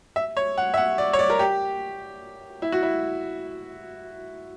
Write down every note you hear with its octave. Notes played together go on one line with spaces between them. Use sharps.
E5
C#5
F#5
E5
F#5
D5
C#5
D5
A#4
G4
E4
F#4
E4